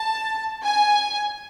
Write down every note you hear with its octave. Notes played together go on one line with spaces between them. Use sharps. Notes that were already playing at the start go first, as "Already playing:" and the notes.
Already playing: A5
G#5